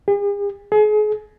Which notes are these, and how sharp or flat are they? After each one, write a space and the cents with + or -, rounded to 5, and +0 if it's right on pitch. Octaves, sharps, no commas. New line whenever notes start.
G#4 -45
G#4 +35